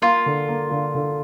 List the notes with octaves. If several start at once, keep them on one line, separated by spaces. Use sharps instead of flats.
A#3 F4
D3
A#3
D3
D3